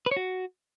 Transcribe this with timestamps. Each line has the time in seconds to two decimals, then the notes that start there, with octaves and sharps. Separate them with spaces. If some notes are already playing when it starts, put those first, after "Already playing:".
0.06 B4
0.11 C#5
0.17 F#4